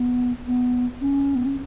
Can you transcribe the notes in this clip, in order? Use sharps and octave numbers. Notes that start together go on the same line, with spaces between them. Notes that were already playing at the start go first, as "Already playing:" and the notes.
Already playing: B3
B3
C#4
B3
C#4